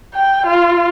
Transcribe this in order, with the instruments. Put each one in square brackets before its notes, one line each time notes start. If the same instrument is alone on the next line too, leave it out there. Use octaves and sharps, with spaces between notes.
[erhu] G5
F4